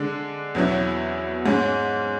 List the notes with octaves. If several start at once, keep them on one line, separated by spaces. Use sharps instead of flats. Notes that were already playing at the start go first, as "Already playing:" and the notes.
Already playing: D3 G#3 D4
E2 B2 F#3 C#4 E4
G#2 G#3 C#4